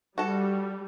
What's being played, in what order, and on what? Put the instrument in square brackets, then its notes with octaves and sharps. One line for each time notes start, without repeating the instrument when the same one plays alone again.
[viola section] G3 [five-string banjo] F#4 A4